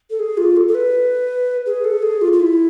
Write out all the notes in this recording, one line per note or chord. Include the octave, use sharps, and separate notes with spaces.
A4
G#4
F4
A4
A4
B4
G#4
A4
G#4
F4
F4
E4